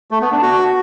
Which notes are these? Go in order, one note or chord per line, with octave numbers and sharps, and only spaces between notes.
A3
B3
D4
F#4